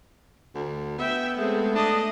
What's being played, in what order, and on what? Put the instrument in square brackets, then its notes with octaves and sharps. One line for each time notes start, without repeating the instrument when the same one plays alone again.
[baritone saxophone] D2
[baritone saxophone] B3 [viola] E5 G5
[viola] G#3 C4 [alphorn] A3
[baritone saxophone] D4 [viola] D#5